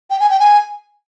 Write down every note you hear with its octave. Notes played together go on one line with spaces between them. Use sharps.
G5
G#5
G5
G#5